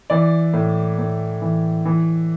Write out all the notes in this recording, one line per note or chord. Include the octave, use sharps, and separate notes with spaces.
E3 D5
A2
A2
E3
E3